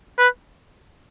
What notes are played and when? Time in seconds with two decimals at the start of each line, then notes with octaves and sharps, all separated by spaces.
0.19 B4